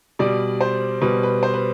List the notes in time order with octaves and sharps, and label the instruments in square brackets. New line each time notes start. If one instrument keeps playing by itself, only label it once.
[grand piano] B2 G3 D5
C5
B2 G3 B4
B4
C5
B4